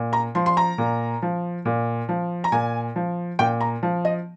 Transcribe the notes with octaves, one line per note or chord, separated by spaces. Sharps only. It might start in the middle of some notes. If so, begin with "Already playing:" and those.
Already playing: A#2
A#5
F3 C6
C6
A#5
A#2
F3
A#2
F3
A#5
A#2 G#5
F3
A#2 G5
A#5
F3
D#5